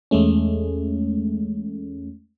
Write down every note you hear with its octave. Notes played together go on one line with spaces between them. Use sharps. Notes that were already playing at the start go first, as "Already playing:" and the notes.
E2 G#3 A3 C#4